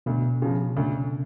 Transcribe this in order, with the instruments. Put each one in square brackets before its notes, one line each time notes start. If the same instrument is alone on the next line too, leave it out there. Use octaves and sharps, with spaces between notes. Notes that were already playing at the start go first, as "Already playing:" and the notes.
[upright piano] D2 [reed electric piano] B2
[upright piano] C#3 F3
[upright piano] D2 [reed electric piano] C#3